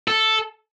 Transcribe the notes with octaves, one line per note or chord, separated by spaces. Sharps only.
A4